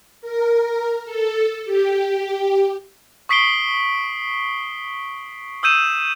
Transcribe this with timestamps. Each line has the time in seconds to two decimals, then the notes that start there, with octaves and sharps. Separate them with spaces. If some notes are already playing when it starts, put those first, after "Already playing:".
0.22 A#4
1.05 A4
1.65 G4
3.29 C#6 D#6 B6 C7 D7 G7
5.63 D#6 E6 G6 D#7 E7